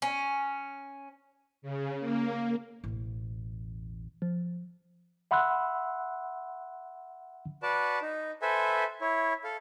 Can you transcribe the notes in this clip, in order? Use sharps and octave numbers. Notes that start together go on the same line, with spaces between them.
C#4
C#3
A#3
E1 A1
F3
E5 F#5 B5 C6 E6 F#6
F#4 B4 D5 A5
D#4
A4 B4 C5 E5 G#5
E4 C#5
A4 F5